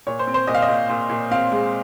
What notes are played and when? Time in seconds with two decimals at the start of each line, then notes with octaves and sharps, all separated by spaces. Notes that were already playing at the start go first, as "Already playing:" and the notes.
0.07 A#2 C#5
0.19 C5
0.27 C4
0.34 C5
0.47 A#2 D#5
0.54 F5
0.62 D#5
0.68 A#2
0.89 A#2
1.10 A#2
1.31 C4 F5
1.51 G#3